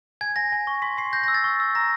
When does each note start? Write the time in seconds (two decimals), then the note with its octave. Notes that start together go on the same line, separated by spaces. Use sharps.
0.21 G#5 G#6
0.36 G#5 A#6
0.52 G#5
0.67 C#6
0.82 C6 B6
0.97 C6 C7
1.13 G6 A#6
1.24 A#6
1.28 E6
1.34 A6
1.44 C#6
1.60 E6
1.75 A#5 A#6